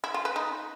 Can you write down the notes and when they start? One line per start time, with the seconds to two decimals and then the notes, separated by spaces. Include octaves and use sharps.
0.04 E4
0.14 F4
0.25 B4
0.36 D#4